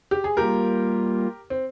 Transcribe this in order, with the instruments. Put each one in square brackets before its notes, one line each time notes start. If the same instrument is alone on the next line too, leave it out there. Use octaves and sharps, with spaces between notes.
[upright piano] G4
G#4
[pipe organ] G3 A#3 F4 [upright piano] G4 A#4
[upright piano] C4